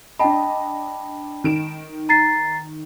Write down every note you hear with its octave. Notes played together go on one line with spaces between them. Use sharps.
D4 D#5 G5 A5 B5
D#3 D7 E7
A#5 A6 C7